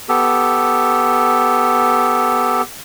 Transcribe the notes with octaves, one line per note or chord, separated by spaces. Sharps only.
B3 G4 A4